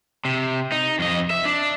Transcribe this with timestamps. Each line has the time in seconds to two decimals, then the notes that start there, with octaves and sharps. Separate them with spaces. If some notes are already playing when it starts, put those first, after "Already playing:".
0.25 C3
0.72 D#4
0.99 F2 D#5
1.30 E5
1.45 D4